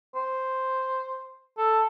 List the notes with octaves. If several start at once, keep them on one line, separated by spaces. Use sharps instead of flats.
C5
A4